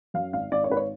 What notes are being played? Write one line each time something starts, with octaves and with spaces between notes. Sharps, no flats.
F#2 F5
G#1 F5
G#1 D5
C#5
G#1 B4
C#5